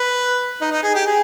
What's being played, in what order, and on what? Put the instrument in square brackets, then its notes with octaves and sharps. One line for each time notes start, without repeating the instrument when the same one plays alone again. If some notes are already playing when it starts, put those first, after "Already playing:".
Already playing: [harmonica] B4
D#4
D#4
G#4
G4
G#4